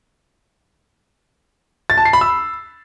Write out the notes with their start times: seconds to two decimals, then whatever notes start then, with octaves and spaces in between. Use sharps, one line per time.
1.90 A6
1.97 A5
2.05 C7
2.13 B5
2.21 E6